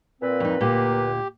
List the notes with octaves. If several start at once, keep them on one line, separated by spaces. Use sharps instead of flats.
A#2 C4 B4
F2 D#4
D2 A#2 A#3 G4